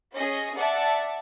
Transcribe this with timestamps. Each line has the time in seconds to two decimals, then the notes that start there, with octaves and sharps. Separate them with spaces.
0.17 C#4 G#4 D#5
0.58 D5 E5 F#5 A5